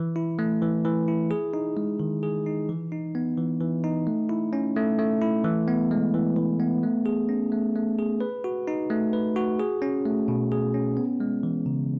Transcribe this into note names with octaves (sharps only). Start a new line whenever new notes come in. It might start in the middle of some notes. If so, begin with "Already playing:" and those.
Already playing: E3
E4
A3
E3
E3
E4
G#4
D#4
G#3
D#3
G#4
D#4
E3
D#4
B3
E3
E3
D#4
A3
E4
C#4
A3
A3
E4
E3
B3
G#3
E3
E3
B3
A3
G#4
C#4
A3
A3
G#4
B4
F#4
D#4
A3
B4
F#4
G#4
C#4
A3
B2
G#4
C#4
B3
G#3
E3
C#3